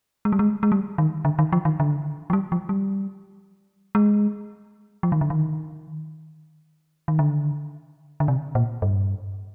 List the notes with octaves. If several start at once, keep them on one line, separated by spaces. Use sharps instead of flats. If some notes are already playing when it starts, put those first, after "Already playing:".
G#3
G3
G#3
G#3
G3
D#3
D3
D#3
F3
D#3
D3
F3
G3
F3
G3
G#3
F3
D#3
D3
D#3
D#3
D3
D3
C3
A#2
G2